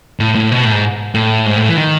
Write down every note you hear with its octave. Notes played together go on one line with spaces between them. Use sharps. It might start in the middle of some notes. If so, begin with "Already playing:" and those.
A2
A2
B2
A2
G#2
A2
G#2
A2
E3
D#3